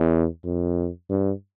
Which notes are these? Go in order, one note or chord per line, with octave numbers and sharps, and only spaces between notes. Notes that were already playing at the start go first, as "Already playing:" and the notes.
Already playing: E2
F2
G2